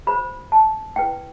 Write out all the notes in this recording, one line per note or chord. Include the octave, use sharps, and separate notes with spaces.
F#4 C5 B5
A5
E4 B4 G5